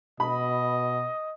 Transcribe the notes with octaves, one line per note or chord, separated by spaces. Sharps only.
B2 D#5 B5